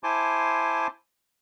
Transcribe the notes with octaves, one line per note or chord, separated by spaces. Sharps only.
E4 C5 G#5 A5 C6 D6